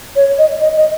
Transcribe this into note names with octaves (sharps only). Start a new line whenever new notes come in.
C#5
D#5
D#5
D#5